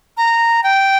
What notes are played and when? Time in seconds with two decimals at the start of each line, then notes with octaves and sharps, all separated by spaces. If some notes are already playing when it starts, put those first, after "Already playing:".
0.17 A#5
0.64 G5